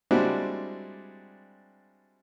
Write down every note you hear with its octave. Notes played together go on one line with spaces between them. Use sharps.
G3 G#3 C4 D4 E4 F#4